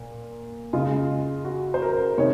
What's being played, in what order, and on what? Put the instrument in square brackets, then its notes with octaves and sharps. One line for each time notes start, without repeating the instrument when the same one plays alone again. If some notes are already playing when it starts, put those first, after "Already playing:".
Already playing: [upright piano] A#2
C#3 G#3 F4
F#4
C5
A#4
C3 D#3 G#3 C#5